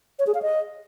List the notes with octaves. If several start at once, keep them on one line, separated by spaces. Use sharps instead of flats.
C#5
G#4
F5
D#5